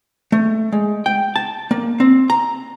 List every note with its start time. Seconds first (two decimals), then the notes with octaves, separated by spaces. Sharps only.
0.32 A3
0.72 G#3
1.06 G5
1.36 A5
1.71 A#3
2.00 C4
2.30 A#5